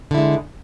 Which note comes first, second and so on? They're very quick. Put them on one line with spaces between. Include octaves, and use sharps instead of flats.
D3 E4 G#3